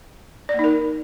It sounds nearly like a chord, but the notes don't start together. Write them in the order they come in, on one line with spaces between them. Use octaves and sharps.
D5 A#3 D#4 A#4